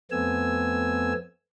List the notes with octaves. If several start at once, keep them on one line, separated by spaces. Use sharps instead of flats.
F2 A3 B3 C4 G#5 E6